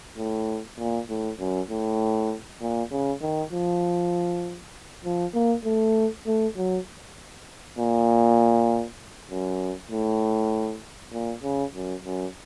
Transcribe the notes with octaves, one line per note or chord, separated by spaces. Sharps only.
A2
A#2
A2
F#2
A2
A#2
C#3
D#3
F3
F3
A#3
A3
A3
F#3
A#2
F#2
A2
A#2
C#3
F#2
F#2